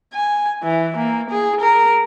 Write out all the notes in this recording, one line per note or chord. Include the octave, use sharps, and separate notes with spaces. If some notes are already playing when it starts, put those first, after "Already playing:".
G#5
E3
A#3
G#4
A#4